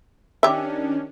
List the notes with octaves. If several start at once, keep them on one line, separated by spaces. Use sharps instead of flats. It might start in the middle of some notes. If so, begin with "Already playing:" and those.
D#3 C#4 D4 G4 E5